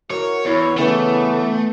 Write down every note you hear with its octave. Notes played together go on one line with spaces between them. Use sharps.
E4 F#4 A#4 C#5
E2 B3 E4 C#5
C#3 E3 A3